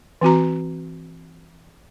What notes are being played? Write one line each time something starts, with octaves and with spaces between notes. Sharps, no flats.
E3 C4 F#4 A#5